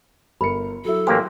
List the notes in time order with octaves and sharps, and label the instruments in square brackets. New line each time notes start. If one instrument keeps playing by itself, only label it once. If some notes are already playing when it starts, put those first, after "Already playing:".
[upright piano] G1 A#4 C#7 [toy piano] B5
[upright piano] F#3 E4 [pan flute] A4
[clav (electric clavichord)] A1 A#3 G4 [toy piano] C5 C6 E6